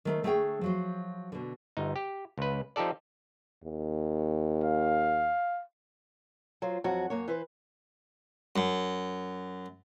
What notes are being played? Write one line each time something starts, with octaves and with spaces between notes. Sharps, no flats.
D#3 A3 C5
D3 A3 B3 G#4 C#5 G5
F3 F#3 C5
B2 D3
G1 D#4
G4
C#2 B4
F3 D#4 G4 A4 D5
D#2
F5
F#3 F4 C5
F2 F#3 F#4
F#2 A#3 C#5
E3 B4 C5
F#2